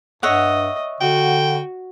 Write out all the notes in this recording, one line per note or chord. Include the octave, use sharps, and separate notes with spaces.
G2 C#5 D#5 E5 F#5
D3 F#4 G5